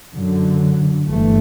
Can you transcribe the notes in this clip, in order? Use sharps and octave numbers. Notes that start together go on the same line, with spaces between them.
F#2 D3 F#3
G1 G2 E3 A3